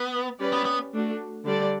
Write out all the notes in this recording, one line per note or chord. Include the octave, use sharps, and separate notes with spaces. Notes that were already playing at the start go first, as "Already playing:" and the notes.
Already playing: B3
G3 C#4 G4 B4 D5
B3
B3
A3 D4 F#4
D3 G3 D4 A4 D5